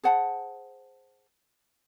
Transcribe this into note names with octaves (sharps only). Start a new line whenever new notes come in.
G#4 C5 F#5 A5